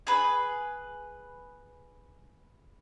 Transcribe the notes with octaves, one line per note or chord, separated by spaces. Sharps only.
G#4 B4